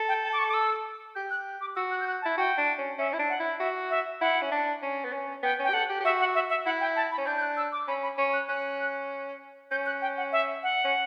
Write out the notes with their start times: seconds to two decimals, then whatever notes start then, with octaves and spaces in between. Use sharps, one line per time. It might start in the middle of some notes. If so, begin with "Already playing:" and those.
Already playing: A4
0.08 G5
0.24 A5
0.33 D6
0.39 C#6
0.49 D6
0.54 E6
1.15 G4 G6
1.30 F#6
1.61 D6
1.76 F#4 E6
1.91 F#6
2.01 G6
2.07 F#6
2.22 A5
2.25 E4
2.37 F#4 G5
2.57 D4
2.78 C#4
2.98 C#4 E5
3.13 E4
3.19 D4
3.29 F#5
3.39 E4
3.59 F#4 E5
3.90 E5
4.21 E4 F#5
4.42 C#4
4.51 D4
4.83 C#4
5.05 B3
5.13 C#4
5.43 B3 G5
5.59 C#4
5.64 G5
5.70 G4
5.73 A4 F#5
5.90 G4
6.00 G4
6.05 F#4 E5
6.20 F#5
6.35 E5
6.50 E5
6.65 E4 F#5
6.80 G5
6.96 A5
7.12 B5
7.18 C#4
7.27 D4 G6
7.37 G6
7.42 F#6
7.57 E6
7.72 D6
7.88 C#4 B5
8.03 B5
8.18 C#4 C#6
8.33 F#6
8.49 C#4 F#6
9.71 C#4 G6
9.86 F#6
10.02 G5
10.17 F#5
10.32 E5
10.63 F#5
10.84 C#4